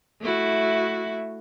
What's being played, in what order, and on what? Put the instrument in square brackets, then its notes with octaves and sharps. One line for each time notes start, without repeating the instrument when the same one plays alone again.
[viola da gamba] A3 E4 F#4